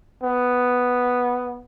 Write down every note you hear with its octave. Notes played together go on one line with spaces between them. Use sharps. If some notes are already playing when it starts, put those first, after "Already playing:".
B3